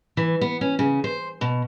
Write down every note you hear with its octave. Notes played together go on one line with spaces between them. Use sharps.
E3
B3
C#4
C#3
C5
B2